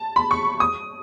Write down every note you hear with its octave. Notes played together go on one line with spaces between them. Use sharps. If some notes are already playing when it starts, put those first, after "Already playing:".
Already playing: A5
B5
C#6
D#6